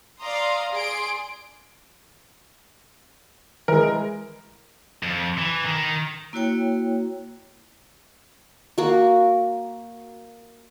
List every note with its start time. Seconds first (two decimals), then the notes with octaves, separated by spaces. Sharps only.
0.21 D5 F5 A#5 C6 D#6
0.73 G#4 D5 C6 D7
3.68 E3 G#3 A#4
5.03 F2
5.38 E3
5.65 D#3
6.33 A#3 E4 F#4 C#5 G5
8.78 A#3 F#4